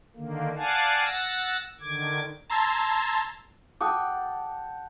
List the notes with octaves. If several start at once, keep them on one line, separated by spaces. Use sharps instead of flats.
D3 D#3 A#3
D5 F5 F#5 G#5 A5
F#5 E6 A6 A#6
D3 D#3 D6 G#6
A5 A#5 C6 E6 G#6 A6
F#5 G5 A5 D6 D#6